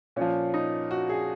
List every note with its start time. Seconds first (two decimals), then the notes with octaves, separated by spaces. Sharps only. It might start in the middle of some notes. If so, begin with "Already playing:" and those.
0.16 A#2 F3 C#4
0.54 D#4
0.91 F#4
1.09 G#4